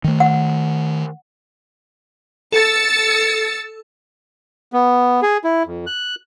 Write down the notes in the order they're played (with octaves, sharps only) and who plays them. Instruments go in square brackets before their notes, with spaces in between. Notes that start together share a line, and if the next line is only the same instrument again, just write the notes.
[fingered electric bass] D#3 A3
[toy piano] F#5
[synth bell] A4 [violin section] E6 A6 C#7
[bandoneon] B3
G#4
E4
F2
F#6